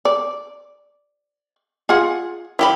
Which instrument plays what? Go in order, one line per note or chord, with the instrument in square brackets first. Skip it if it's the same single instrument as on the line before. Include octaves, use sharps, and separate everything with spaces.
[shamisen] D5
F4 G#4 F#5
[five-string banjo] D#3 G4 B5 [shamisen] E4